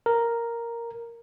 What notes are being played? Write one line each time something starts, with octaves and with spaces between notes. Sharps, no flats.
A#4